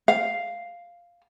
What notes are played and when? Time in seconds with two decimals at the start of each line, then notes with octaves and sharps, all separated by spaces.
0.08 F5